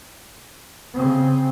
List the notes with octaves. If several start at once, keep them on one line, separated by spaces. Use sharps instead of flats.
C#3 C4